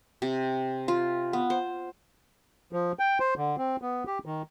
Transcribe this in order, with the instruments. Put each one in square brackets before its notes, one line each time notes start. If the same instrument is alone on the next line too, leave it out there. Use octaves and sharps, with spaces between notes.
[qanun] C3
F4
B3
C5
[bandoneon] F3
G5
C5
D3
C4
B3
G4
D#3